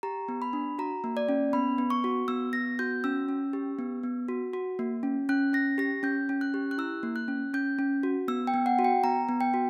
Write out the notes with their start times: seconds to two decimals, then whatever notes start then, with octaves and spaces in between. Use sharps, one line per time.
0.03 G4 A#5
0.28 B3
0.42 B5
0.53 D4
0.79 F#4 A#5
1.04 A#3
1.17 D5
1.29 C#4
1.53 B3 B5
1.78 B3
1.90 C#6
2.04 F#4
2.28 B3 E6
2.53 B3 A#6
2.79 F#4 G6
3.04 C#4 E6
3.29 C#4
3.53 G4
3.79 B3
4.03 B3
4.28 F#4
4.53 F#4
4.79 A#3
5.03 C#4
5.29 C#4 F#6
5.53 C#4 A#6
5.78 G4 A#6
6.03 C#4 G6
6.29 C#4
6.41 F#6
6.54 G4
6.71 F#6
6.78 E4 E6
7.03 A#3
7.16 F#6
7.28 C#4
7.54 C#4 G6
7.79 C#4
8.03 F#4
8.28 B3 E6
8.47 G5
8.54 B3
8.66 F#5
8.79 F#4
8.84 G5
9.04 B3 A#5
9.29 B3
9.41 G5
9.54 F#4